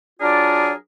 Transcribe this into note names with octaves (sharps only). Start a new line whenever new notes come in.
F#3 D4 F4 G#4 A#4 D5